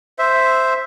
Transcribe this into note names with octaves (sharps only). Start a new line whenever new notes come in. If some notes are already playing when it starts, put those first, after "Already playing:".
C5 E5